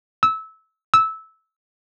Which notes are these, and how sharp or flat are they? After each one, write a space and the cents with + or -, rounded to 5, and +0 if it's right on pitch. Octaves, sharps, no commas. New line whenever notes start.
E6 -20
E6 -15